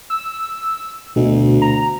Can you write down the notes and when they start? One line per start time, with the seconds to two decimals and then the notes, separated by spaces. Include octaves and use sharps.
0.10 E6
1.16 D2 B2
1.62 A#5